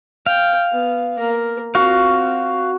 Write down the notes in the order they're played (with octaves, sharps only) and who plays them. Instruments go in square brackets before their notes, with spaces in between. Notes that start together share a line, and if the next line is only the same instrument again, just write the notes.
[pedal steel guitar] F5 [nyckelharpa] G5
[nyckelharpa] B3
A#3 A#4
[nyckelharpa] C4 [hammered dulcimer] F#4 [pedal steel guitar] F5